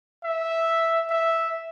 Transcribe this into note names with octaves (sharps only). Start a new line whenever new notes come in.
E5
E5